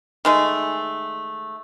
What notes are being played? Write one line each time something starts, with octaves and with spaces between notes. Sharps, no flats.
D#3 G#3 A3